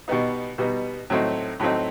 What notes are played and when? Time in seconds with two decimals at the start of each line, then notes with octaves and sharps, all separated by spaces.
0.08 B2 G3 B3 D#4
0.58 B2 G3 B3 D#4
1.10 A2 F#3 A3 C4 D#4
1.60 A2 F#3 A3 C4 D#4